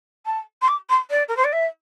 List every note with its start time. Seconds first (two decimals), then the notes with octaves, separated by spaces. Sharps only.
0.26 A5
0.61 C6
0.68 D6
0.89 C6
1.10 D5
1.28 A#4
1.36 C5
1.44 D5
1.52 E5